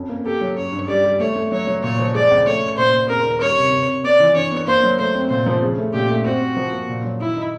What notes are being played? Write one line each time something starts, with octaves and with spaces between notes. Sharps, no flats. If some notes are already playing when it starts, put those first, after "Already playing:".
Already playing: F2 C#4
A#3
G4 A4
F#3
C#4 C#5
G2
G3 D5
G3
A3 C#5
A3
F#3 C#5
F#3
A#2 C#5
F3
G#3 D5
C#2
A3 C#5
C#4
A#2 C5
A#2
C#3 A#4
D#2
G3 C#5
C3
C3
C3
B3 D5
E3
D4 C#5
B3
A#3 C5
F#3
A3 C5
C4
A#2 C5
F3
C#3
A3
A#2 G4
A3
C4 F#4
C4
F3
A#3
A#2
F#3
D#3 E4
D#4